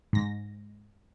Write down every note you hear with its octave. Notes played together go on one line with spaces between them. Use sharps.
G#2 A#6